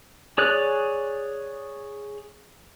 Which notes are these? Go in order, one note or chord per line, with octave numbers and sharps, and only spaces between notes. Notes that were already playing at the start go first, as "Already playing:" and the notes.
G#4 C#5 D5 F#6